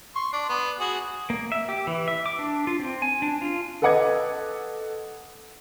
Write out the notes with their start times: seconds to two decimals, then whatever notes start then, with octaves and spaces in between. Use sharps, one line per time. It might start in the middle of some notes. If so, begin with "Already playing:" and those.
0.16 C6 C#6
0.33 D4
0.49 B3
0.80 F#4 G#4
1.30 A#3
1.52 E5
1.69 G4
1.87 E3
2.08 E5
2.26 D6
2.39 D4
2.67 F4
2.79 C4
3.02 G#5
3.22 D4
3.42 F4
3.82 A4 B4 D#5 F#5 D6 G#6